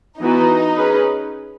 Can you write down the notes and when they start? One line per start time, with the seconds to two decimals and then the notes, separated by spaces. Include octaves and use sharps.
0.20 E3 B3 D#4 F#4 B4
0.76 C#4 G#4 B4